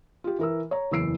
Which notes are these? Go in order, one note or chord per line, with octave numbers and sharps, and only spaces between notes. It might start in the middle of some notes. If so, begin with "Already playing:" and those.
F4 G4
E3 A#4 E6
C#5 A#5
F#1 E2 E6 C7 D7